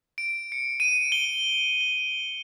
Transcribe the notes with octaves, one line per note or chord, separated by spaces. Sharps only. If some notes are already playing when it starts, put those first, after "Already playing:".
D7
C#7
D#7
G7
G7